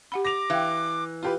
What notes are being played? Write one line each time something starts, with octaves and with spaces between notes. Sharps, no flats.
G4 F#5 B5
D6 A#6 F7
E3 F5 G5
F4 G4 B4